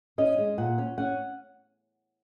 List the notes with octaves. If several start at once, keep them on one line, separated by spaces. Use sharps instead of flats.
C#4 D#5
G#3
A#2 F#5
C#4
C#4 F#5